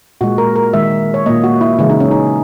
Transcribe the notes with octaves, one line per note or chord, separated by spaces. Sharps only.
A#2 G#3 F#4
A#4
A#4
D#3 G#3 E5
C#5
A#2 A#3 D#5
F#4
E4
C#3 E3 G#3 E4
D#4
C#4
D#4